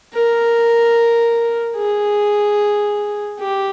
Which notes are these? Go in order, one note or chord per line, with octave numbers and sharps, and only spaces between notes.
A#4
G#4
G4